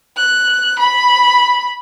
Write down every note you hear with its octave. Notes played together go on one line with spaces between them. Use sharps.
F#6
B5